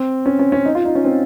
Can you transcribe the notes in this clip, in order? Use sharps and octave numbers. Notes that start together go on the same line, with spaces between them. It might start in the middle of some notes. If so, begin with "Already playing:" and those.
Already playing: C4
C#4
C#4
C#4
D#4
F4
D#4
C#4
C4